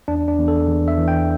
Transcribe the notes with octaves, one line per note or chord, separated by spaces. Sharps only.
E2 D4
D4
E2
A4
E2
E5
E3
G5